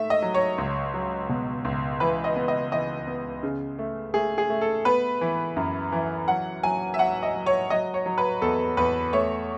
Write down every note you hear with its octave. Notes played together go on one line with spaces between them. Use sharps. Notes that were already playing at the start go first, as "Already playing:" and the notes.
Already playing: G#2 A3 E5
D#5
F#3
C#5
C#2
F#3
B2
C#2
E3 B4
D#5
B3
D#5
E3 D#5
B3
C#3
A3
A3 G#4
G#4
A3
A4
B3 B4
E3
F#2
E3
F#3 F#5
F#3 G#5
E5
F#3 F#5
D#5
F#3
C#5
F#3 D#5
C#5
F#3
B4
E2 A4
E2 B4
A3 C#5